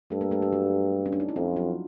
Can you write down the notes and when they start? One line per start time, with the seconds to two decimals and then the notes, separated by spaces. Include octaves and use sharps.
0.10 G2 A3 A4
0.21 A#3 A#4
0.31 A3 A4
0.42 G3 G4
0.52 F#3 F#4
1.06 C#4
1.13 D4
1.20 D#4
1.29 E4
1.36 F2 F3 F4
1.56 F#3 F#4